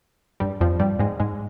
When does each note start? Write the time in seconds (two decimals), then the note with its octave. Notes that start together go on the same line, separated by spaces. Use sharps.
0.40 G2 G3
0.61 F2 F3
0.79 G2 G3
0.99 G#2 G#3
1.20 G#2 G#3